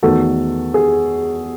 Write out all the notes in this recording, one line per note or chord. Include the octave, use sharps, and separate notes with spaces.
E2 D#3 A3 F#4 A4
G#4